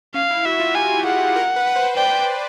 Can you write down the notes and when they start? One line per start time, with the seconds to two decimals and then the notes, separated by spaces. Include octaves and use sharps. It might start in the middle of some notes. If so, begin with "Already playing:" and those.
0.14 C#4 F5
0.31 E4
0.45 F#4 E5
0.60 F4
0.75 G4 G#5
1.05 G#4 F#5
1.36 A#4
1.56 B4
1.67 B4
1.76 C5
1.96 D5 G5